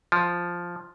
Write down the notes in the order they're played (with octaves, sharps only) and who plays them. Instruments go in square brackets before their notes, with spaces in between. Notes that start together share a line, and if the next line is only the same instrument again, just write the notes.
[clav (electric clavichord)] F3